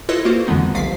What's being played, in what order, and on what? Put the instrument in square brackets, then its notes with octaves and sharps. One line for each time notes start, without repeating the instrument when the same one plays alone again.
[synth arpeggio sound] E4 F4 A4 B4 C#5 D#5
A#3 F4 F#4 C5
F2 D3 E3 G#3 B3 D#4
G1 C2 F3 F#3 F5 B6